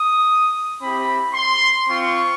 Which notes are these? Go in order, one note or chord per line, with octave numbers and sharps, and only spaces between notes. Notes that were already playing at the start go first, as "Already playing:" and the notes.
Already playing: D#6
C4 E4 G4 B5
C6
C4 F4 C#6